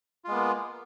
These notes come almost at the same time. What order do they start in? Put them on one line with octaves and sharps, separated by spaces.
F4 G#3 B3 A#3